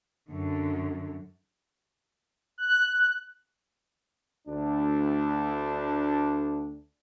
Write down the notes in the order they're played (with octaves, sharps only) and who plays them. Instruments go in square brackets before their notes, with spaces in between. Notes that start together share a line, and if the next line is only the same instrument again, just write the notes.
[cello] F#2 D3
[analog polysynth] F#6
[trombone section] D2 D4